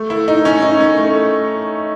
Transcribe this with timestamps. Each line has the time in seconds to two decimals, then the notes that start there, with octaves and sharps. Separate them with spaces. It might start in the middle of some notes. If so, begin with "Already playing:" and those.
Already playing: A3
0.10 E4
0.28 D#4
0.45 C#4
0.62 D#4
0.80 C#4
0.98 A3